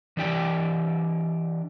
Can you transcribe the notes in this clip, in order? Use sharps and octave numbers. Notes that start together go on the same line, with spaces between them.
E3 D4 G4 D5 G5